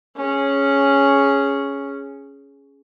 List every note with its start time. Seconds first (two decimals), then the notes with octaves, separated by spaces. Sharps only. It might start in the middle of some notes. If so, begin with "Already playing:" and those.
0.17 C#4 G#4